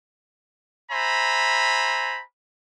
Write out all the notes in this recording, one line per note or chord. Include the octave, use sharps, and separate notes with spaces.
C5 E5 G#5 A#5 B5